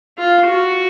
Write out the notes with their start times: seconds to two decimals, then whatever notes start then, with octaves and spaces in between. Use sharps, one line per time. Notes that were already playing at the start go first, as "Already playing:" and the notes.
0.18 F4
0.46 F#4